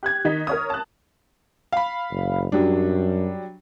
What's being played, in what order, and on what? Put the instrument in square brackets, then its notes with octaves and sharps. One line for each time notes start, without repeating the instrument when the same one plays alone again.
[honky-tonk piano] G4 F#6 G#6
D#3 D#4 D#5 B6
A#4 C#5 D#6
A5 F#6
[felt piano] F5 B5
[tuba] F#1
[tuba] F#2 [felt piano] F#3 G3 D4